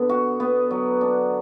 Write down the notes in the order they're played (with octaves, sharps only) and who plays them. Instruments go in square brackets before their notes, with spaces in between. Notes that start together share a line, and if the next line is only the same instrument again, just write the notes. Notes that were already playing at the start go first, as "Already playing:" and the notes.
Already playing: [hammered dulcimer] D3 B3
F#4
B3
F#3
D4